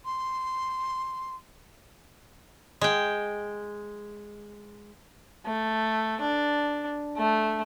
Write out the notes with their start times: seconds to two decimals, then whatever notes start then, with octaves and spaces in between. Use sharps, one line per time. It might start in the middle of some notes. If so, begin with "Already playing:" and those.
0.05 C6
2.81 G#3 G5
5.45 A3
6.20 D4
7.17 A3